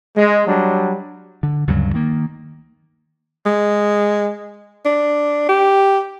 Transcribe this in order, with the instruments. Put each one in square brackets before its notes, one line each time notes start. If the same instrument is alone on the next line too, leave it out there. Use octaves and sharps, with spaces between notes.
[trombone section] G#3
F#3 G3 D4
[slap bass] D3
D2 G2 C#3 F#3
D#3 A#3
[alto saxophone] G#3
D4
G4